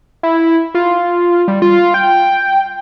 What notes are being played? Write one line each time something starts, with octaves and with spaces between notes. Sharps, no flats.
E4
F4
G3
F4
G5